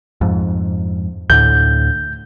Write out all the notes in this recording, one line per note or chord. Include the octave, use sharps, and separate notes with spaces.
F2 G#2
D2 A2 D3 G6